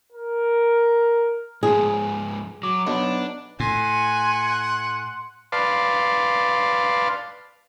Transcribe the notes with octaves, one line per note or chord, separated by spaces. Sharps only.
A#4
G#2 F3 G#3 G#4
F#3 D6
B1 B2 D4
A2 F#5 G#5 C6
B4 D5 F5 A5 C6